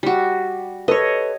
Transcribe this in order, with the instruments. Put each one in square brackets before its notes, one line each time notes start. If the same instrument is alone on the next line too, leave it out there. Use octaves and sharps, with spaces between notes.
[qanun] G3 F#4
[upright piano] A4 B4 [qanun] C#5 D#5